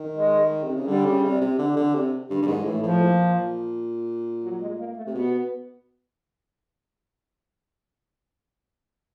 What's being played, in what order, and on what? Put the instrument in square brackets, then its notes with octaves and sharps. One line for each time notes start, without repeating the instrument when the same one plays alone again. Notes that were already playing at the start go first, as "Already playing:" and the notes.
Already playing: [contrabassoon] D#3
[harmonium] G#3
[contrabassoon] C3
C#3
[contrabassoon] D3 [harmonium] G3
[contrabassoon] C#3
C3
C3
D3
D3
C3
[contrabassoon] G2 [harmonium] D3
[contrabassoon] G2
[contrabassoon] G#2 [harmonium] D#3
[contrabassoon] A2 [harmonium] E3
[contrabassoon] A2 [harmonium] F3
[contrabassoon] A#2
[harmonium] F#3
G#3
A#3
A3
[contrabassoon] C3
[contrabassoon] B2 [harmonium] B3